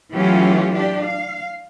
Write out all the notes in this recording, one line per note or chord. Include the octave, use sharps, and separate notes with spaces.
E3 F#3 A3 C#4 F4 G4
D4 G4
F5